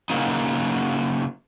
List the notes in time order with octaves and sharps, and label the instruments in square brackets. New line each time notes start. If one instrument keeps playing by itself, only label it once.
[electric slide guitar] C#3 F#3 A#3 D#4